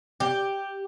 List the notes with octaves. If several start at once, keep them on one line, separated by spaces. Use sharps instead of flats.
G4